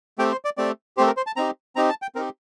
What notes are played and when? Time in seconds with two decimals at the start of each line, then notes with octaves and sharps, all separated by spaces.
0.18 A3 C4 G4 G5
0.32 C5
0.45 D5
0.58 A3 C4 G4 D5
0.97 A3 C4 G4 C5
1.07 A#4
1.17 C5
1.27 A5
1.36 C4 D#4 G4 A#5
1.76 C4 D#4 G4 A#5
1.89 A5
2.02 G5
2.15 C4 D#4 G4 A#4